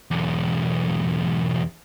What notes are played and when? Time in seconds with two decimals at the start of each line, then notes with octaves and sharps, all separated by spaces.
0.11 B1 E2